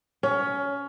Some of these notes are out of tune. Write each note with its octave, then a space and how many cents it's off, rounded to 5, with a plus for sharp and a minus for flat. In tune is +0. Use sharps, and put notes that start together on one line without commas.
C#4 +20